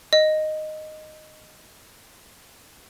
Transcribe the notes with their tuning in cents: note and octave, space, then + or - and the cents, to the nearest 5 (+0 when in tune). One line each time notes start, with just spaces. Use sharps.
D#5 -5